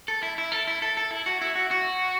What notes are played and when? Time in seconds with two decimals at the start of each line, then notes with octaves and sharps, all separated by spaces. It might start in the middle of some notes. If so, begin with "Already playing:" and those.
0.08 A4
0.23 E4
0.38 E4
0.52 A4
0.67 E4
0.82 A4
0.97 A4
1.11 E4
1.26 F#4
1.41 E4
1.55 F#4
1.71 F#4